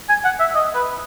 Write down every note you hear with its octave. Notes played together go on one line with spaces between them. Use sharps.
G#5
F#5
E5
D#5
B4